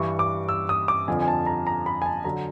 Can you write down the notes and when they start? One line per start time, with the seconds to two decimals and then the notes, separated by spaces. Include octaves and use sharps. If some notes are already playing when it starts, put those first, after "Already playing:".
Already playing: G2 E3 G3 C#6
0.19 D6
0.49 E6
0.69 D#6
0.88 D6
1.08 F2 D3 F3 G#5
1.22 G#5
1.28 A5
1.46 A#5
1.67 A#5
1.86 B5
2.02 G#5
2.06 A5
2.25 D3 F#3 A#5